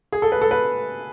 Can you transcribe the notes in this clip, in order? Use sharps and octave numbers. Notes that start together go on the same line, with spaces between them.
G#4
A4
B4
A4
B4